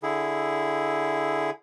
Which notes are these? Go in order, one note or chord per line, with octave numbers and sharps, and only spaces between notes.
D3 E4 G#4